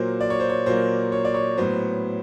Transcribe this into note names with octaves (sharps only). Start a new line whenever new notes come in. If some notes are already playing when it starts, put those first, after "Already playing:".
Already playing: A#2 F#3 A#3 C5
D5
C#5
C5
C#5
A#2 F#3 A#3 C5
C#5
D5
C#5
A2 F#3 B3 C5